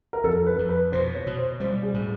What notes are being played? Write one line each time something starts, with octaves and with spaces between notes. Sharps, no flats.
A#4
F2 A4
B4
F2
B4
B2 C5
C#5
B2
C5
G3 C5
G#4
A2